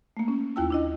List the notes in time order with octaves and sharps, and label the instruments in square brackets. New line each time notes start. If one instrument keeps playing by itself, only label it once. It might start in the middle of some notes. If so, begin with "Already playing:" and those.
[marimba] A3 A#3
C#4
D#2 E4 F4 G5 A5 E6
D4 E4 D#5